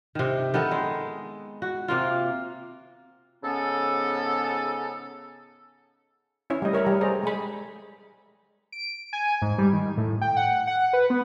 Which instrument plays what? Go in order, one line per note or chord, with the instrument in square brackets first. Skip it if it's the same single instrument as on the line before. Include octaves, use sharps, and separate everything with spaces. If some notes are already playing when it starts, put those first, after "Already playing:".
[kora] C3 D#3
D#3 B3 D#4 A4
G#3
F#4
C3 A#3 F4
[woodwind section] G#2 C#3 B3 C#4 A4
[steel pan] C#4 E4 C#5
G3 A3 D#5
A#4 C#5 E5 B5
G3 A#5
G#4 A4 C5 D5 D#5 A#5
G#3 G#5 B5
[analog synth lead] D7
G#5
G#2
G3
D#3
A2
G5
F#5
F#5
B4
B3